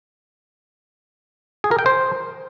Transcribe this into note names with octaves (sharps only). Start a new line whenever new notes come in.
G#4
A#4
G5
C5